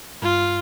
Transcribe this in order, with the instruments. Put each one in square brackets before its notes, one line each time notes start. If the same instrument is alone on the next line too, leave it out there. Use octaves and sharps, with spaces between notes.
[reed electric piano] G2 [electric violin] F4